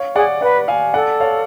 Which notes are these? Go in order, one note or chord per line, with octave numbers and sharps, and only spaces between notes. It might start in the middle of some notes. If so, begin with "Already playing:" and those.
Already playing: C#5 F5
G#4 D5 F#5
B4 D5 F#5
F5 G#5
A4 D5 F#5
C#5 F5